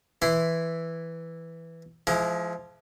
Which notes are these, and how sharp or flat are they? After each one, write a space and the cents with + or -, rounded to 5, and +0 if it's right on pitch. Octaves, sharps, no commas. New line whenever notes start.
E3 +0 E4 +0 C6 -15
F3 -15 G#3 +30 E4 +0